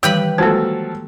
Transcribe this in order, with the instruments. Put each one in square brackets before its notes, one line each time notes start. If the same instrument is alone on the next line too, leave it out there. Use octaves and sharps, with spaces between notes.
[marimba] D#3 E3 G3 [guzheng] G4 B4 B5
[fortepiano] F3 F#3 A4 [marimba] G#3 A#3